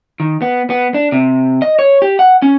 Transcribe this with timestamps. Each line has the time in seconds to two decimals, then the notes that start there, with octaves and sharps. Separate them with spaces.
0.20 D#3
0.42 B3
0.70 B3
0.94 D4
1.12 C3
1.62 D#5
1.79 C#5
2.02 G4
2.19 F#5
2.42 C#4